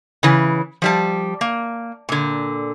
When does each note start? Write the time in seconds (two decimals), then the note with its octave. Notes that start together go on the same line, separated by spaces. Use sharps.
0.23 C#3 E3
0.82 F3 G3 A5
1.41 A#3
2.09 A#2 D3